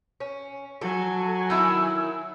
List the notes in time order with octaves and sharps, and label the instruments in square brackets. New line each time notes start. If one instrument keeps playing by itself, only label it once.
[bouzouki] C#4
[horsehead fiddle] F#3 G#5 [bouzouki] A4
[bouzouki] D#3 E4 [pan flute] E6